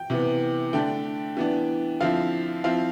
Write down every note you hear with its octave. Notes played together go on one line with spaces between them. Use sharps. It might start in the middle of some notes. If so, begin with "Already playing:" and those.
Already playing: G5
C3 E3 B3
D3 A3 D4 G5
E3 B3 D4
D3 F3 C4 E4 F5
F3 C4 E4 F5